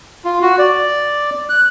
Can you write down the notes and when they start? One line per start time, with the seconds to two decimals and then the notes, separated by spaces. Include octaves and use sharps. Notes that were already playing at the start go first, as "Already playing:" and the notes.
0.25 F4
0.42 F#4
0.59 D5
1.49 F#6